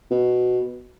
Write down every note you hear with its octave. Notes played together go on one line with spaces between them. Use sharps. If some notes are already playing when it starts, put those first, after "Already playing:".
B2